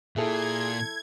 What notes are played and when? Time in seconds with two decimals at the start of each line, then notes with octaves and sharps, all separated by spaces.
0.16 A#2 E4 G#4 A4 E5 G#6